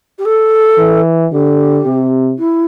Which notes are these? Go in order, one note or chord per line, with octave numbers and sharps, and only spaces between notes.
G4
A4
E3
D3 G4
C3
E4